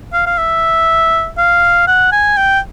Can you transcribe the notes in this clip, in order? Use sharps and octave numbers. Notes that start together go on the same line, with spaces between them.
F5
F5
E5
F5
F#5
G#5
G5